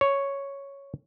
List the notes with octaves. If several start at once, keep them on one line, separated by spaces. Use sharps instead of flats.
C#5